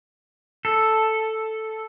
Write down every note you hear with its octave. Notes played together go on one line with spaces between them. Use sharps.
A4